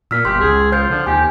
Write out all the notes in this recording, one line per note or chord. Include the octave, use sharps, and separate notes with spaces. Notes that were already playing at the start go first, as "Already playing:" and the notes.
A#2 E6 F6 B6
G1 G4 C6
C#2 G#4
F4 C5 G6 C7
D3 F3
D#2 G4 G#5